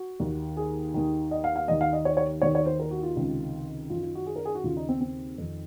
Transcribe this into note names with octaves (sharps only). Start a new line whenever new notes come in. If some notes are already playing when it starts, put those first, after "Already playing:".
Already playing: F#4
D#2 D#3
G#4
D#2 D#3
D#5
F5
F5
D#2 D#3 D#5
F5
D#5
C#5
C#5
D#2 D#3 C#5
C#5
C5
A#4
F#4
F4
C#2 C3 D#3
F#2 D#3 F4
F4
F#4
G#4
A#4
G#4
F#4
D#2 C#3 F4
D#4
C4
C4
F2 D#3